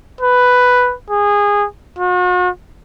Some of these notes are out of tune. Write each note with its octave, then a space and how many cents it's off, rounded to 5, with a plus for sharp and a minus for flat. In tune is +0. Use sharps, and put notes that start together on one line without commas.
B4 +5
G#4 -20
F#4 -40